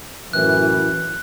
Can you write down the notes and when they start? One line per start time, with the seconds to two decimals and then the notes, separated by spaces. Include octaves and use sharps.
0.33 F#2 A2 E3 F#6